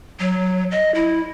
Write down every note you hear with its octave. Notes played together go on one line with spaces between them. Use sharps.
F#3
D#5
E4